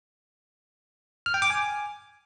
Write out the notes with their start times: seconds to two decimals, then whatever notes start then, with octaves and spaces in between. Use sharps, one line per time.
1.26 F6
1.34 G5
1.42 D6
1.50 G#5